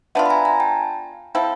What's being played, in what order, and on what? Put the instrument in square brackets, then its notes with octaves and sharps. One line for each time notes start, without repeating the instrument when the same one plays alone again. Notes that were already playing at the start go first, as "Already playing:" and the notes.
[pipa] B3 D4 F4 [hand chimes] E5 F#5
[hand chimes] B5
G#5 A#5
G#5 A#5
G5 A5
[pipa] C4 E4 A4 [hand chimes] F5 G5